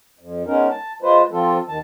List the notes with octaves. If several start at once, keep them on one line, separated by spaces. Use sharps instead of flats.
F2
G#3 B3 C#4 D#4 A#4
A5
G#3 F4 B4 C5
F3 C4 F4 A4
D#2 D#3 A5